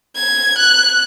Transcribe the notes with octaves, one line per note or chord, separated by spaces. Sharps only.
G#6
F#6